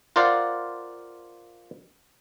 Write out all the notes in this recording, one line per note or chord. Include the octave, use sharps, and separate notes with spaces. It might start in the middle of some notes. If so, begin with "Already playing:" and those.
F4 A#4 C5 D5 F5 F#5